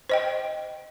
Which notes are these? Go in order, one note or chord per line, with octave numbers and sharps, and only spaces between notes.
C5 D#5 G5